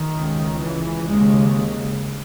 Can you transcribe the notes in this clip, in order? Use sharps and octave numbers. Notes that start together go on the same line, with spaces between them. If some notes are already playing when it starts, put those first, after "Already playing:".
Already playing: D#3
C#2 C#3
E3
D#2 C#3 G#3